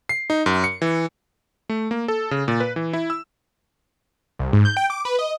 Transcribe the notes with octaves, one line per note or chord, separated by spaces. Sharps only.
C7
D#4
F#2
C#7
E3
A3
A#3
A4
C#3
A#2
B4
E3
E4
E6
C2
G#2
G6
G5
D6
B4
D#5